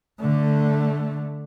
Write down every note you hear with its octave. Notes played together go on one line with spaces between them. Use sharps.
D3 A3